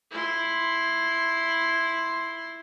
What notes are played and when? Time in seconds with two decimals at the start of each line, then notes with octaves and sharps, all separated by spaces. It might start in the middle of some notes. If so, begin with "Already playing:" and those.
0.11 E4 C6